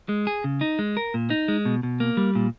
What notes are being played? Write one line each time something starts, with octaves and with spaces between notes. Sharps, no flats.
G#3
G#4
C#3
D#4
G#3
A#4
A#2
D#4
G#3
B2
B2
A#3
G3
A#2